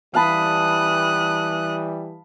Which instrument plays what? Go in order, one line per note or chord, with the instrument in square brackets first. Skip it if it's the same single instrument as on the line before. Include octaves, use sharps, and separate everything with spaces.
[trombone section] E3 G3 [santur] F5 A5 B5 [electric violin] D#6 F#6